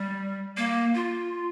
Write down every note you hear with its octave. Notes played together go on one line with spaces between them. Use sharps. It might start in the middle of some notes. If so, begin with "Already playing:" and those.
Already playing: G3
A#3
F4